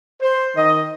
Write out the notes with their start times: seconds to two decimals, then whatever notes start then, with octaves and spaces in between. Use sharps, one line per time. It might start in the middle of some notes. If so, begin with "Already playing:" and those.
0.21 C5
0.56 D#3 D#5